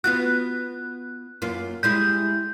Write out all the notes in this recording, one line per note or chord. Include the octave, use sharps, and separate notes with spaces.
B3 F4 F#4 F#6
F#2 A#3 F4
G3 G#3 E4 G6